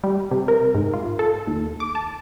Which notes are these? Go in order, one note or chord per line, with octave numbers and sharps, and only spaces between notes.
G3
C3
A#4
G#2
F4
A4
D#2
D6
A5